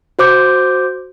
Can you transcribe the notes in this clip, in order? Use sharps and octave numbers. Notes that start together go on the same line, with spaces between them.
F#4 C5 D6 G6